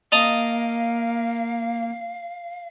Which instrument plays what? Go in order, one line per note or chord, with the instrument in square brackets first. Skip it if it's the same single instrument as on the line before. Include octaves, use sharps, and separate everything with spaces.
[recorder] A#3 [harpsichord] D#5 A5 A#5 [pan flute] F5